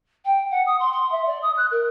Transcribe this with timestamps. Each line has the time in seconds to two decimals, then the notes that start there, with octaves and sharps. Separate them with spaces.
0.24 G5
0.50 F#5
0.66 D#6
0.79 C6
0.91 C6
1.11 E5
1.26 D5
1.42 D#6
1.56 F#6
1.70 A#4